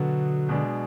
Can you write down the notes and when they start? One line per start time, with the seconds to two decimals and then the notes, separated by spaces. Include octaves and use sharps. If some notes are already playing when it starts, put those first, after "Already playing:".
Already playing: B2 D3 F#3 B3 F#4
0.49 B2 G#3 D4